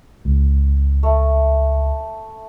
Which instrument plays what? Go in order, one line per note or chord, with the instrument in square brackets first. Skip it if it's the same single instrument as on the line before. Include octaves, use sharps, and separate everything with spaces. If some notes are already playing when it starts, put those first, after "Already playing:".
[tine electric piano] C#2
[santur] A3